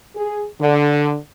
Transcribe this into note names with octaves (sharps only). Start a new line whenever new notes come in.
G#4
D3